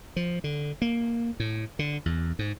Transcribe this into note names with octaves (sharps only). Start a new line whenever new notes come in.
F3
D3
A#3
A2
D3
E2
G#2